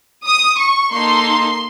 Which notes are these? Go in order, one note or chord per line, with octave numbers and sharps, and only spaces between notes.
D#6
C#6
A#3 D#4 A4 C6